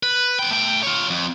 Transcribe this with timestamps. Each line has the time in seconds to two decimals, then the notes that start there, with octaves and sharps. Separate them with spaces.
0.03 B4
0.39 B3 G5
0.51 A3 G5
0.83 F4 C#5
1.10 F2